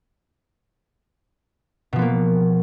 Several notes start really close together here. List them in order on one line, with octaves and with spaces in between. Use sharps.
B2 F3 B3 A#3